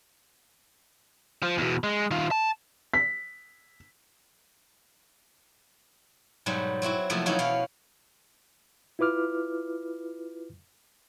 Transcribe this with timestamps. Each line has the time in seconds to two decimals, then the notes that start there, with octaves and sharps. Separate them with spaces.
1.43 F3
1.58 E2 B2
1.84 G#3
2.11 D#3 F4
2.31 A5
2.94 B6
6.46 G#2 B2 F#3 G3
6.82 F#3 C4 E4 F#4
7.10 C3 F3 F#3 A3 A#3
7.26 E3 F#3 A#3 C#4 D#4 E4
7.39 B2 C#4 F5
8.99 E4 F4 B4 D6 F6